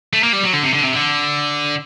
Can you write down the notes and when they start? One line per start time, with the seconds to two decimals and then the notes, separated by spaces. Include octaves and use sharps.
0.13 A3
0.23 A#3
0.33 G3
0.43 F#3
0.53 D3
0.63 C3
0.74 D3
0.83 C3
0.93 D3